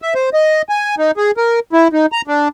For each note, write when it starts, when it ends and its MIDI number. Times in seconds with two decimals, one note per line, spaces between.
0.02 0.14 76
0.15 0.30 72
0.33 0.62 75
0.69 0.95 80
0.98 1.11 63
1.17 1.31 68
1.37 1.60 70
1.73 1.88 64
1.93 2.06 63
2.12 2.22 82
2.27 2.48 62